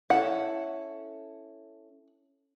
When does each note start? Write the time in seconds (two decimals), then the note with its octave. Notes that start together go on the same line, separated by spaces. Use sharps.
0.10 C#4 E4 A4 F#5